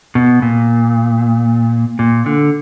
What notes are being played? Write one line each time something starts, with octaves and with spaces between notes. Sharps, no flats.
B2
A#2
A#2
D3